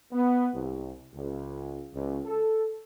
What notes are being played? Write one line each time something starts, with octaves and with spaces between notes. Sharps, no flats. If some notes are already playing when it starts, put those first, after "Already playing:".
B3
C2
C#2
C#2
A4